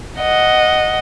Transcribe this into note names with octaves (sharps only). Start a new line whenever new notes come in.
D#5 F#5